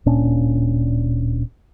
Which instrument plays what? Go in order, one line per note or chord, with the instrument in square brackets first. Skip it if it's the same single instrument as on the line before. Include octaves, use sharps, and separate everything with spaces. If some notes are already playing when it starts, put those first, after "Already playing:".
[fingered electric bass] D1 A#2 C#4 D4